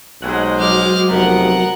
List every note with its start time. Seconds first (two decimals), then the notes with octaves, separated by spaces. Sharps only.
0.22 B1 G#3 C5 F#5
0.60 F#3 D6 F6
1.09 F1 B3 A#4 F#5